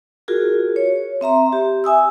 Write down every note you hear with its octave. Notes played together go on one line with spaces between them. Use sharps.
F4 F#4 G#4 A#4
C#5
C4 E5 A#5 C6
G4
E5 G#5 D#6 E6